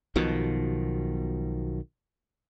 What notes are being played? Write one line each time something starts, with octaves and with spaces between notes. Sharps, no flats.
B1 B2 D#3 F3